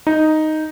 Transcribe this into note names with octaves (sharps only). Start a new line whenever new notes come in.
D#4